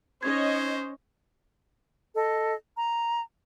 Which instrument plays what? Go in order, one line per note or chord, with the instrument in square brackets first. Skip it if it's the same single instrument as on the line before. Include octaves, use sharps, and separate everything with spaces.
[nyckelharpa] C#4 [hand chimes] D#4 G#6 [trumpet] C5 [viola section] C#5 D#5
[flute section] A4 D#5
A#5